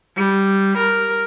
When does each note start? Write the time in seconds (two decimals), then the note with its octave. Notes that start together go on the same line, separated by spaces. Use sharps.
0.16 G3
0.78 A#4